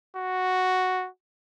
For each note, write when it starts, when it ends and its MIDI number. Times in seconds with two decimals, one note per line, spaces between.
0.17 1.08 66